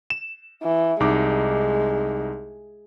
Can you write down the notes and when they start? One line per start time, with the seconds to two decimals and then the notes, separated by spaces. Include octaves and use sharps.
0.10 E7
0.63 E3
1.00 C2 G#3 D#4 D6